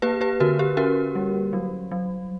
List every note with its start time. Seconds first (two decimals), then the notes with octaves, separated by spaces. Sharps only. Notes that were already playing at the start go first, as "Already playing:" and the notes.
0.02 A#3 G4 B4
0.21 G4 B4
0.40 D3 F#4 A#4
0.59 G4
0.77 C#4 F#4 A#4
1.15 G3
1.53 F#3
1.92 F#3